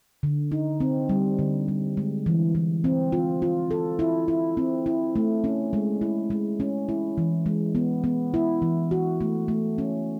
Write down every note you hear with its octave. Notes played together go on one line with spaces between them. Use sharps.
D3
D#4
C4
G3
D3
G3
G#3
E3
E3
C4
F4
F4
A4
E4
E4
C4
E4
A3
C#4
G#3
E4
G#3
C#4
E4
E3
G#3
B3
B3
E4
E3
F#4
A3
A3
C#4